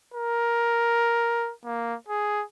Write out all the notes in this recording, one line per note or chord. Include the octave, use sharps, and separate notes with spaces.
A#4
A#3
G#4